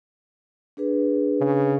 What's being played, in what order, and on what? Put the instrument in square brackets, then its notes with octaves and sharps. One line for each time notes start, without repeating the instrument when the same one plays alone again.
[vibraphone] D4 G#4 B4
[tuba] C#3